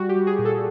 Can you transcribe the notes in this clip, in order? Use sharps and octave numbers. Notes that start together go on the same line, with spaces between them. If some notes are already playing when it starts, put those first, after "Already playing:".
Already playing: G3 F#4
G4
G3
G#4
A#2
A4